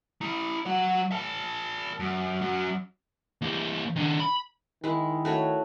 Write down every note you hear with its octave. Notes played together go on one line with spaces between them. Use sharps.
E4 A#5
F#3 F#5
A#4 A5
F#2
F#2 F#3
E3 A#3
D#3 D4
B5
D#3 G#3 E4
A3 F#4 C#5